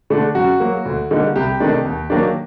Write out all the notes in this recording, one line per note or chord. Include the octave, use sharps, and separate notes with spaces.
D3 A3 D4
F#2 F#4
F#3 A#3
D2
D3 G3 A#3 D#4
C2 G4
C3 D#3 A3 D4
D#2
D#3 F#3 A#3 D4